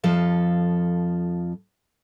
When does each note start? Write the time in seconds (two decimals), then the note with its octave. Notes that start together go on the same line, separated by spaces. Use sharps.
0.03 F2 F3 A4 F5